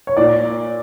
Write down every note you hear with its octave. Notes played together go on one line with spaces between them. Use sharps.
C#5
A#2 D5